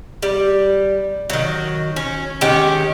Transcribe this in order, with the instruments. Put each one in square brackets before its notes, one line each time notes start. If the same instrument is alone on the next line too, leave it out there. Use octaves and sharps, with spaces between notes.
[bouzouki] G3
D#3 F#3
C#4
D#3 G#3 C#4 G4